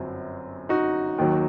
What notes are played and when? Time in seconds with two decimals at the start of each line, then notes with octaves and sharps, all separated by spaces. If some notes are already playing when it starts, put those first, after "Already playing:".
Already playing: G1 F#2 F#3 C4
0.69 D#4 F#4
1.18 D#2 D#3 F#3